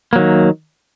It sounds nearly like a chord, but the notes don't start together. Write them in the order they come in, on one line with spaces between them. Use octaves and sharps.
A#3 F#3 D#3